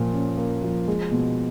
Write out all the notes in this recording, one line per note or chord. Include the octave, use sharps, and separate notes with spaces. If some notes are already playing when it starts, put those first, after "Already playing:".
Already playing: A#2 F3 A#3
C#4
A#3
F3
G#3
B2